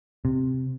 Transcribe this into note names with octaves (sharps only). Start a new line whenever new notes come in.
C3